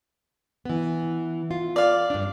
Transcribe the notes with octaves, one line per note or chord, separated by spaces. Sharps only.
E3 B3
F4
D5 F5
G2 D4